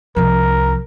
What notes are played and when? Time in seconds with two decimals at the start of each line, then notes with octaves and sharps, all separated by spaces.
0.16 C2 F3 A#4